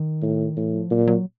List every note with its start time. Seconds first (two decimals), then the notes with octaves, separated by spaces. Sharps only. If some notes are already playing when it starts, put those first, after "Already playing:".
Already playing: D#3
0.22 A2
0.57 A2 E3
0.73 F3
0.90 A#2 F#3
1.07 F#3